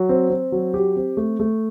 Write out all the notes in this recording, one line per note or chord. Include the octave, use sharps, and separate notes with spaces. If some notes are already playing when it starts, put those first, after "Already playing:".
Already playing: F#3
C4
C4
F#3
G4
C4
A3
A3